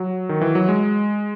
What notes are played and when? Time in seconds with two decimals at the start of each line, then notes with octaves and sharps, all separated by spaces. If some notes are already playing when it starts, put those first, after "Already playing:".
Already playing: F#3
0.29 D#3
0.41 E3
0.55 F#3
0.69 G#3